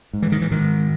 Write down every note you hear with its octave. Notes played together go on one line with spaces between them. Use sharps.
G#2
E3
D#3
E3
G#2 D#3